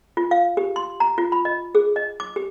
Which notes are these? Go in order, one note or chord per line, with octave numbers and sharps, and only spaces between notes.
F4
F5
G4
C6
A#5
F4
B5
D#5
G#4
D#5
D6
G4